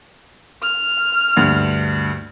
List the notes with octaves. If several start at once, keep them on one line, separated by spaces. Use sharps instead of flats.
F6
D2 G2